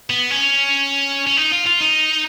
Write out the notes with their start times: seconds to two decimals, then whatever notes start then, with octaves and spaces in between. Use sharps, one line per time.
0.10 B3
0.31 C#4
1.27 C#4
1.37 D#4
1.52 F4
1.66 F4
1.81 D#4